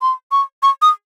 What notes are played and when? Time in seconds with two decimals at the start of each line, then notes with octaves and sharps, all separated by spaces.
0.02 C6
0.32 C#6
0.63 C#6
0.82 D#6